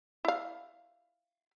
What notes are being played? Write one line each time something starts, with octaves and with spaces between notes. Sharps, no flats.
E4 F5